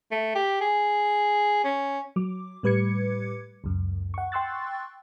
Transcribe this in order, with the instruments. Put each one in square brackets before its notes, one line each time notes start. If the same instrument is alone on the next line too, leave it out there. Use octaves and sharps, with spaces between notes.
[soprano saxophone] A3
G4
G#4
C#4
[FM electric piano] F#3 D6
A2 G3 B4 D6 G#6 C#7
C#2 F#2
F#5 C#6
G5 C6 C#6 E6 F#6 A6